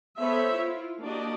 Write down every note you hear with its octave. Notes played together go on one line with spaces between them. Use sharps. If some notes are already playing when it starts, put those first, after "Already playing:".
B3 A4 C5 C#5 E5 B5
E4 F4
A#3 D4 F#4 G4 D5 D#5